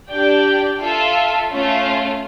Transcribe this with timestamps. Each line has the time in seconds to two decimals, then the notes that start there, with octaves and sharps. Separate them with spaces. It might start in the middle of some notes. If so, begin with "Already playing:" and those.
0.09 D4 G4 D5 G5
0.79 F4 A4 E5
1.50 A3 C#4 F4